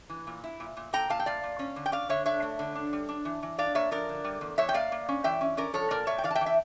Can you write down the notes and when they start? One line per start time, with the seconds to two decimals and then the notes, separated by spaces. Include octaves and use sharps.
0.09 E3
0.27 A#2
0.44 E4
0.60 A#2
0.77 A#2
0.93 A#2 G5 A#5
1.09 A#2 F5 A5
1.19 G5
1.26 A#2 D5 F5
1.43 A#2
1.59 C#4
1.76 D3
1.86 G5
1.92 C#4 D5 F5
2.09 D3 C#5 E5
2.26 D4 C#5 E5
2.42 A3
2.59 D3
2.75 D4
2.93 G3
3.09 D4
3.25 E3
3.43 E3
3.58 D4 D5 F5
3.75 A#3 C#5 E5
3.91 F3 A#4 D5
4.09 D3
4.24 G3
4.41 E2
4.58 E2 C#5 E5
4.69 G5
4.74 A#3 D5 F5
4.92 A#3
5.09 C#4
5.24 E3 E5 G5
5.41 C#4
5.57 C#4 A#4 D5
5.74 F3 A4 C#5
5.90 A#2 A#4 D5
6.07 A#2 C#5 E5
6.18 G5
6.24 E3 D5 F5
6.31 A5
6.35 E5 G5
6.41 E3
6.46 E5 G5